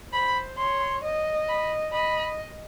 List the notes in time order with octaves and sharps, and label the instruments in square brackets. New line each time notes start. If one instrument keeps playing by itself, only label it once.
[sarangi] C5 [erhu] B5
[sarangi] C#5 [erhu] C6
[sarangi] D#5
[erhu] B5
[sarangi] D#5 [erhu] B5